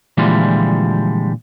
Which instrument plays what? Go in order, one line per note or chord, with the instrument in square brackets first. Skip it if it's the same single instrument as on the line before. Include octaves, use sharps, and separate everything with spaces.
[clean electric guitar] A#2 D3 E3 F3 G3 G#3